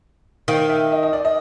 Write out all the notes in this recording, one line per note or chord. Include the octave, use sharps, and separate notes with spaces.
D#3 F5
E5
D#5
D#5
D5
D#5